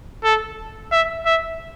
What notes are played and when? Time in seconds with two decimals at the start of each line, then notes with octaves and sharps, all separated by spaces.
0.24 A4
0.92 E5
1.26 E5